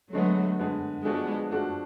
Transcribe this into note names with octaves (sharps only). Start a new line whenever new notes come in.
D3 F#3 G#3 A3 B3
D3 G#3 B3
F3 G#3 A3 B3 D4 F#4
F3 A3 D4 F#4